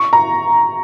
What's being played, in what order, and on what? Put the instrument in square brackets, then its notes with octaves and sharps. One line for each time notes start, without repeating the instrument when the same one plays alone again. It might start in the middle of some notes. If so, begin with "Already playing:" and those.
Already playing: [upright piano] C#6
A#5